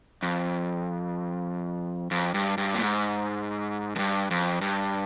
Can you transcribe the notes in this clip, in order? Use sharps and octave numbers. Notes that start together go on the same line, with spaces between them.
F2
F2
G2
G2
A#2
G#2
F2
G2
F2
G2